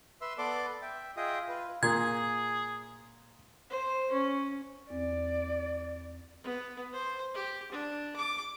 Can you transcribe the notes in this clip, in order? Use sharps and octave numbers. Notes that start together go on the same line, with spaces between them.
B4 E5 C6 E6
B3 A4 B4 D5 C6 D6
E5 G5
F4 G#4 D#5 E5 G5 D#6
F4 B4
A#2 G#4 G#6
C5
C#4
E2 C4 D5
B3
C5
G4
D4
D6